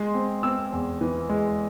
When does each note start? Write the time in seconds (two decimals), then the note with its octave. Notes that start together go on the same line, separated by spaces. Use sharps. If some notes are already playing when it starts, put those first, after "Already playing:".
Already playing: G#3 C6
0.14 C4
0.43 C4 E6
0.72 E2
1.01 E3
1.29 G#3